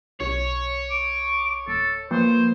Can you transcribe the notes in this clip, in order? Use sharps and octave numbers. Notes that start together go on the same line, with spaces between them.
B1 C#5
D6
D1 A4
F3 A#3 B4 C5